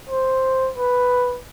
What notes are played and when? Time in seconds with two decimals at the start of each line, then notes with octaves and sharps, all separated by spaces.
0.10 C5
0.78 B4